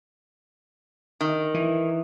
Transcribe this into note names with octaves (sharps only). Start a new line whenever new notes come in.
D#3
E3